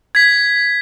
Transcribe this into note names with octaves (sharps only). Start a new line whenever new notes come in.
G#6 B6